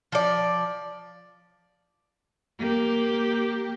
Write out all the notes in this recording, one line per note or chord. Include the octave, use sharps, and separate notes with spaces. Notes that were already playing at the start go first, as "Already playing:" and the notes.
F3 D5
A#3 G4